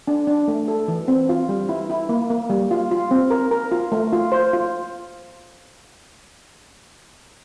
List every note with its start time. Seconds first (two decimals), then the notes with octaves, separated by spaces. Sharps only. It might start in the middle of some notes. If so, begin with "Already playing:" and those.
0.08 D4
0.27 D4
0.48 A3
0.68 A4
0.88 E3
1.08 C4
1.29 F4
1.49 G3
1.69 E4
1.90 E4
2.09 A#3
2.30 A#3
2.50 G3
2.71 F4
2.91 F4
3.11 C4
3.31 A#4
3.51 A#4
3.72 F4
3.92 A3
4.13 F4
4.32 C5
4.53 F4